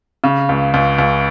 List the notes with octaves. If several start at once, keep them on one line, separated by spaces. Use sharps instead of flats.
C#3
C#2
C#2
C#2